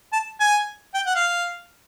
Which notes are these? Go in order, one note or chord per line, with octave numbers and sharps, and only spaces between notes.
A5
G#5
G5
F#5
F5